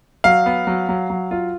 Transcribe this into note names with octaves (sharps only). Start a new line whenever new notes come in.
F#3 F5
B3
F#3
F#3
F#3
F4